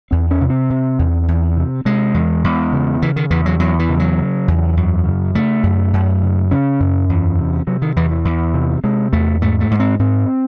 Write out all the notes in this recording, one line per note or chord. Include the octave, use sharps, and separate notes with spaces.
E2 C4
C#4
C3
C4
C3
E2
E2
C3
C3 G#3
E2
E2
C#3
C#3 E3
D#3
E2 E3
F#3
E2 F#3
E3
C#3
F#3
C#3
E2
F#2
C#3
C#3 A3
F#2
F#2
C#3
C#3 C#4
F#2
E2
C3
C3 F#3
D#3
E2 E3
E3
E2
C3
C3 G#3
E2 A3
G#2 A3
A3
G#2
C4
G#2 C4